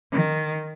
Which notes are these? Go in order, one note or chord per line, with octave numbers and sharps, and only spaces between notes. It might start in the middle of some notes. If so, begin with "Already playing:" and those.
D#3